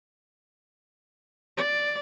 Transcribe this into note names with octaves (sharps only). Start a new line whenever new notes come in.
D5